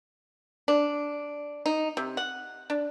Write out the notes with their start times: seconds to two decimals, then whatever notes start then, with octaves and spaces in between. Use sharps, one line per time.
0.68 D4
1.66 D#4
1.97 C3
2.17 F#5
2.70 D4